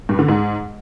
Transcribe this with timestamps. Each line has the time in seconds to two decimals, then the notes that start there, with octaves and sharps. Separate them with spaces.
0.09 G2
0.19 D3
0.28 G#2